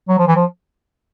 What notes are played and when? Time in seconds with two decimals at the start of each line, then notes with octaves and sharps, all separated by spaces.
0.09 F#3
0.18 F3
0.27 E3
0.36 F3